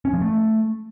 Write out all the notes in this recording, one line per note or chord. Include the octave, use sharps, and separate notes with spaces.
C#4
F3
A3